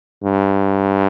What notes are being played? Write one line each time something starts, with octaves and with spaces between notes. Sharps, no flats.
G2